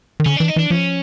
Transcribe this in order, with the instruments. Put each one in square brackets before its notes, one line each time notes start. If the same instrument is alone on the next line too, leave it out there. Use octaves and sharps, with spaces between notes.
[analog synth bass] D#3
[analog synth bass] D3 [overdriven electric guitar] C#4
[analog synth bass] E3 [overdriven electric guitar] D4
[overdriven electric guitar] D#4
[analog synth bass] E3 [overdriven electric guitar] D4
[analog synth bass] F3 [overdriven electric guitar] C#4